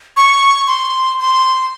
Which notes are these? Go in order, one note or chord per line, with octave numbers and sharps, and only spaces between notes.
C#6
C6
C6